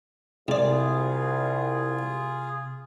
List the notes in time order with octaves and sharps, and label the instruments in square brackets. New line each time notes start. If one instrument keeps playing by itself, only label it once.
[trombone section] C2 [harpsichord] G#2 D5 [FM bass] C3 [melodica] F4 G#4